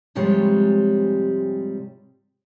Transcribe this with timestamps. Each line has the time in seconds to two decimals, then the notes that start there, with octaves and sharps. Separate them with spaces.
0.15 G#2 C3 F3 G3 G#3 C#5